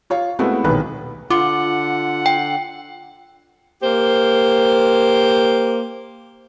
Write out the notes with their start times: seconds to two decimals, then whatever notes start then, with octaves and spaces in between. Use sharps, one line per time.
0.10 F4 C#5 F5
0.39 G#3 A3 B3 C4 E4 F#4
0.64 D#1 B1 D#3 B4
1.30 D3 F4 F#5 D6
2.26 G5
3.82 A#3 G4 C5